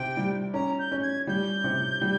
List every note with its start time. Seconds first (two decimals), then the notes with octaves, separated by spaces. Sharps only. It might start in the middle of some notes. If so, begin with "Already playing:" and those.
Already playing: C3 G5
0.17 G3
0.54 C#4 A#5
0.79 G6
0.92 C#4
1.03 G#6
1.27 G3 G6
1.64 C3
2.01 G3